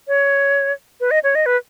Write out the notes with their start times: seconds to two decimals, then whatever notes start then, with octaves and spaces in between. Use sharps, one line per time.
0.08 C#5
1.00 B4
1.11 D#5
1.24 C#5
1.35 D#5
1.46 B4